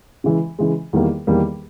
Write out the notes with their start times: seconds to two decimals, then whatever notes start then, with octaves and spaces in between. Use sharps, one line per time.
0.24 C#3 E3 G#3
0.59 C#3 E3 G#3
0.93 E2 D#3 G3 A#3
1.27 E2 D#3 G3 A#3